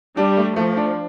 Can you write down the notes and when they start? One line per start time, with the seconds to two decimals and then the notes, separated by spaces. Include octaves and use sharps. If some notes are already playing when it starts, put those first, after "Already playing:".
0.17 G3 D4
0.37 A3
0.56 F3 A3
0.77 D4